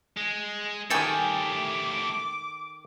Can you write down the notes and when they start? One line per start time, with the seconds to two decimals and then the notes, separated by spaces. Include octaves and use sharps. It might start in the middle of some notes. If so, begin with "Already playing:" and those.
0.17 G#3
0.90 D#3 A3 G4 A4 G5 G#5 D6